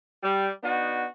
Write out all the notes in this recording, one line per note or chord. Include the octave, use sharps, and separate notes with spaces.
G3
B3 D4 D#4 F#4